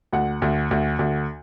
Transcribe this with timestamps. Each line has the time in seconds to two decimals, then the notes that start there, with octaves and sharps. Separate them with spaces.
0.13 D2 F#5
0.42 D2
0.71 D2
0.99 D2